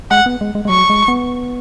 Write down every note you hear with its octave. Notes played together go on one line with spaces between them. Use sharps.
G#3 F#5
B3
G#3
G#3
G#3
F#3 C#6
G#3
B3